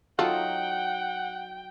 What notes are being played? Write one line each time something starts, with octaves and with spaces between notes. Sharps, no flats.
F#3 D#4 F4 A4 F#5 G5